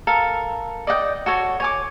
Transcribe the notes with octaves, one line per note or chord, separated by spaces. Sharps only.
A4 A#4 F5
D5 D#5 F#5 G5
F#4 A4 C#5
C#5 G#5 D6